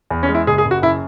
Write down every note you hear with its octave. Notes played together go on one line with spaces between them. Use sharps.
E2
C#4
G#3
E4
F#1 G#4
G#4
F#1
F#4
F#2 E4